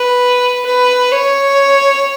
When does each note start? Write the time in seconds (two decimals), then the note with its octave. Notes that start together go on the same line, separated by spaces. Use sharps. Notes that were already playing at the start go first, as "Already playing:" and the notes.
Already playing: B4
0.67 B4
1.11 C#5